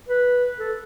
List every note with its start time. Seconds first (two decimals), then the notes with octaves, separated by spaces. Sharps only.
0.09 B4
0.60 A4